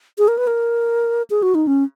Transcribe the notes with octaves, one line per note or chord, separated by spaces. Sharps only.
G#4
A#4
B4
A#4
G#4
F#4
D#4
C#4